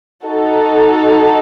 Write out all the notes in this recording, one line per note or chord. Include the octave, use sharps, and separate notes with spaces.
D#4 F#4 A4